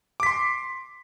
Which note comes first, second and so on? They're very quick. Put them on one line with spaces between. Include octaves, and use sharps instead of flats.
D6 B6 C6